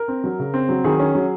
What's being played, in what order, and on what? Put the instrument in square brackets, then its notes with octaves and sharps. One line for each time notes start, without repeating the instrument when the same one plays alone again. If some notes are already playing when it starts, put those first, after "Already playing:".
Already playing: [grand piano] A#4
C4
F#3
C#3
C4
F#3
D#3 G#4
C#4
F#3